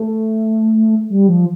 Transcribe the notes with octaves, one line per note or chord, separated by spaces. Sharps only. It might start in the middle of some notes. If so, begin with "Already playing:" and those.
Already playing: A3
G3
F3